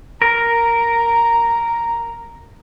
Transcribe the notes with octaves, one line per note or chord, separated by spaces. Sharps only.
A#4 A#5